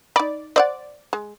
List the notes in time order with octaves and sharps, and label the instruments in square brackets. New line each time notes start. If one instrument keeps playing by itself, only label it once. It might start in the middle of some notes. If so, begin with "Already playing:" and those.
[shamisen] D#4 B5 [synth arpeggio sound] D5
[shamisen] C5 E5 F#5 [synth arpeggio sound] D5
[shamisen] G#3